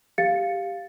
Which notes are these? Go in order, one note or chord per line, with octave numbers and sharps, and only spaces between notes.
G4 F5 A6 C#7